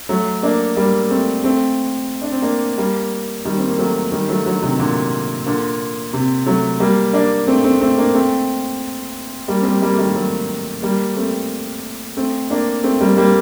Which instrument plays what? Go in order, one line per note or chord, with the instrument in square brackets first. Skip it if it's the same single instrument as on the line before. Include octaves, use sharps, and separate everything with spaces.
[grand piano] F#3 A3
A#3 D4
G3 A#3
A3 C4
A3 C4
D4
C4
A#3 D4
G3 A#3
D#3 G3
C4
A#3
F#3 A3
D#3 G3
F#3 A3
D3 F#3
C3 D#3
A#2 D3
A#2 D3
C3
F#3 A3
G3 A#3
A#3 D4
A3 C4
A3 C4
A3 C4
A#3 D4
A3 C4
G3 A#3
C4
G3 A#3
G3 A#3
A3
D#3 G3
F#3 A3
G3 A#3
A3 C4
A3 C4
A#3 D4
A3 C4
G3 A#3
G3 A#3